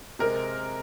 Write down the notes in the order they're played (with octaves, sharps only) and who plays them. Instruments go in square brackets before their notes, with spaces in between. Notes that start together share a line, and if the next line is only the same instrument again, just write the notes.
[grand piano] C3 G#3 C4 A#4